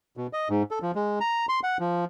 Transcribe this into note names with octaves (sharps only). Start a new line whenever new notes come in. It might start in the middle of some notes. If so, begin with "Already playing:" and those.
B2
D#5
G#2
A4
F3
G#3
A#5
C6
F#5
F3